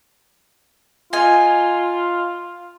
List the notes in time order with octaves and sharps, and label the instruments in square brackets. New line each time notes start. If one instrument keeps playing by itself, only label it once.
[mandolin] D#4 G#5 [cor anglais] F4